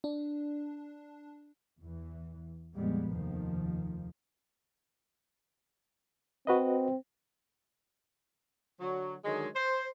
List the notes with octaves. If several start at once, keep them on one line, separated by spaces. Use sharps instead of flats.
D4
E2 E3
F2 A#2 G3 G#3 B3
F1 D#2 D#3 F3
C4 F#4 B4 D#5
D3 F#3
D3 D#3 F#3 G#3
C5